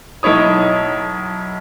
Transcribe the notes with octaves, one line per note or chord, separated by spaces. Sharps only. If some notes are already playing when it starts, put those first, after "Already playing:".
B1 D#4 E4 C#5 D#6